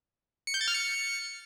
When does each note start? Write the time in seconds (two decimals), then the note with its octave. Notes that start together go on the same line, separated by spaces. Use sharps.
0.47 C#7
0.54 G6
0.61 A6
0.68 F6
0.74 C#7